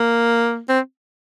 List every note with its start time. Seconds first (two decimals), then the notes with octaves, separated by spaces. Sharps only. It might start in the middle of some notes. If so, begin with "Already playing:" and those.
Already playing: A#3
0.69 C4